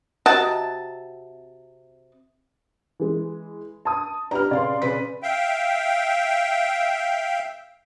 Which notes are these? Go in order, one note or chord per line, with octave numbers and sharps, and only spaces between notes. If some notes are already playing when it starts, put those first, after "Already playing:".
C3 F#4 D#5 A5
E3 G#3
A5 D#6
D4 G4 B4 A#5 F6
C#3 D5 F5 C6
C#3 B4 B6
E5 F5 G5